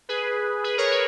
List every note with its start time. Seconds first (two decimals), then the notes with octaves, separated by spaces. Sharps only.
0.09 G#4 B4
0.64 G#4 B4
0.78 A#4 C#5
0.92 G#4 B4